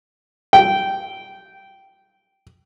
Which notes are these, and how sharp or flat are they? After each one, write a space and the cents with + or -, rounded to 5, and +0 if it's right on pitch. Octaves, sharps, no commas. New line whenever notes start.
G5 -10